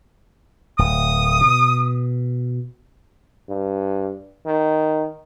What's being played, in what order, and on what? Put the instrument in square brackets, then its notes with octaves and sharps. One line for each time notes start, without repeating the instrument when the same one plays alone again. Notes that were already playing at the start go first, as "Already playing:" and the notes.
[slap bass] D1 [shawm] D#6
[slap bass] B2
[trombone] G2
D#3